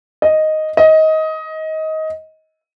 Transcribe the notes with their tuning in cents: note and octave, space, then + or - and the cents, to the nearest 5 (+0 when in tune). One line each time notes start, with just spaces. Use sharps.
D#5 +0
D#5 +20